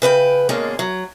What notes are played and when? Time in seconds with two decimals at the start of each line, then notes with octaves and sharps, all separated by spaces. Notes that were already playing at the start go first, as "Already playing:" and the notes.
0.02 C#3 B4 C#5 G5
0.49 B2 D3 G#3 A#3 C#4 D4
0.79 F#3